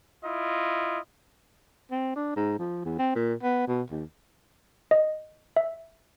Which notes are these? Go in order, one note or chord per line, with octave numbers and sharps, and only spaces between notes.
E4 F4 D#5
C4
D4
G#2
F3
E2
C4
A#2
B3
B2
D#2
D#5
E5